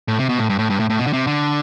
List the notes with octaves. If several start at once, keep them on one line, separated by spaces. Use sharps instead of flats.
A2
C3
B2
A2
G2
A2
G2
A2
A2
B2
D3
C3
D3